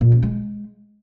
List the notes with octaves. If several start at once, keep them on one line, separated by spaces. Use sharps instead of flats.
A#2
C#4
G#3